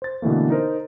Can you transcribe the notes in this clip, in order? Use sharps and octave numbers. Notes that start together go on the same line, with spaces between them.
C5 A6
B2 D3 E3 A3 A#3
D#4 A#4 C5